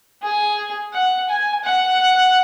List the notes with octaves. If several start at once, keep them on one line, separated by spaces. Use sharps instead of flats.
G#4
F#5
G#5
F#5